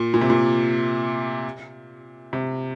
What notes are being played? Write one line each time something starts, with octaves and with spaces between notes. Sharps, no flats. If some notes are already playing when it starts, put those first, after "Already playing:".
Already playing: A#2
A#2
C3
A#2
C3